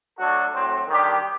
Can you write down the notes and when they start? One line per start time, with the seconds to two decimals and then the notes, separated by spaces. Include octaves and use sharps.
0.18 F#3 A3 D4 F#4 A4
0.53 A2 F#3 C4
0.87 D#3 G3 D4 G4